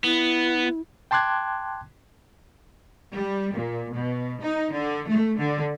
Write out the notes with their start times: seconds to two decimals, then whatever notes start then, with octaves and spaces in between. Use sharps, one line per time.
0.04 B3 E4
1.11 G5 A5 C6 D6 F#6 G#6
3.14 G3
3.55 A#2
3.92 B2
4.41 D#4
4.72 D3
5.08 A3
5.38 D3